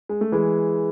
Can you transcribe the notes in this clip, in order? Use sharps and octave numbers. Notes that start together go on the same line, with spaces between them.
G#3
A3
E3 G#3